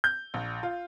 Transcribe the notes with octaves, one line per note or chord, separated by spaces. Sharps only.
G6
A#1
F4